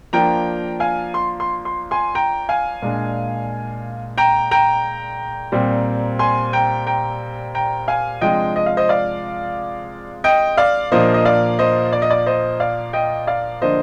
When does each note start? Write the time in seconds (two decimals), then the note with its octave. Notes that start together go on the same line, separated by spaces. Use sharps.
0.13 F3 A#3 D4 G5 A#5
0.80 F5 G#5
1.14 C6
1.40 C6
1.65 C6
1.91 G#5 C6
2.15 G5 A#5
2.49 F5 G#5
2.82 A#2 G#3 D4
4.18 G5 A#5
4.51 G5 A#5
5.52 A#2 G3 C4
6.19 G#5 C6
6.53 G5 A#5
6.87 G5 A#5
7.55 G5 A#5
7.88 F5 G#5
8.21 C3 F3 G#3 D4 D#5 G5
8.56 D#5
8.66 F5
8.77 C5 D#5
8.89 D5 F5
10.24 D#5 G5
10.57 D5 F5
10.92 A#2 F3 A#3 D4 C5 D#5
11.14 D#5
11.25 D5 F5
11.59 C5 D#5
11.92 D5
12.02 D#5
12.10 D5
12.26 C5 D#5
12.60 D5 F5
12.93 D#5 G5
13.27 D5 F5
13.62 D3 F3 A#3 D4 C5 D#5